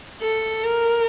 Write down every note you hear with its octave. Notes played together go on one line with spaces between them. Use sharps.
A4
A#4